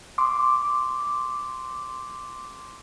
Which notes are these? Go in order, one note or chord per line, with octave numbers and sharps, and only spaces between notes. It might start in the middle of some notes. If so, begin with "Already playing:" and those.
C6 D6